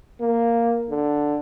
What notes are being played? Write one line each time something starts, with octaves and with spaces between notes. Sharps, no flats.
A#3
D3